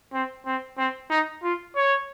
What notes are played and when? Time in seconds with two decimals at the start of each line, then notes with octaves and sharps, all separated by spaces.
0.13 C4
0.46 C4
0.77 C4
1.10 D#4
1.43 F4
1.76 C#5